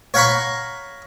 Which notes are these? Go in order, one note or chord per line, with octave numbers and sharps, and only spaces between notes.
C#5 F5 F#5 A#5 B5 C#6